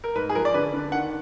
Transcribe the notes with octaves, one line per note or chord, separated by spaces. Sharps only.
A#4
G#2 B4
G#4
F3 A#4
D5
D3 B4
D3
D#3 F#5